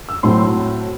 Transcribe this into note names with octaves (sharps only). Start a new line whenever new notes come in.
E6
A2 F#3 A3 C4 C6